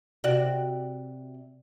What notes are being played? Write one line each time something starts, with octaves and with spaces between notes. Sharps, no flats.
C3 F#4 D5